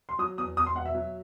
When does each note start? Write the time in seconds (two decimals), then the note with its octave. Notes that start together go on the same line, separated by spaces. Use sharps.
0.09 C6
0.19 F#3 D#6
0.37 E2 D#6
0.57 E2 D#6
0.66 C6
0.75 B2 F#5
0.86 E5
0.95 F#3